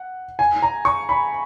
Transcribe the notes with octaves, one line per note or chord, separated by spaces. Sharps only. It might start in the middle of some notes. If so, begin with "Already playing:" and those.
Already playing: F#5
G#5
A#5
C#6
B5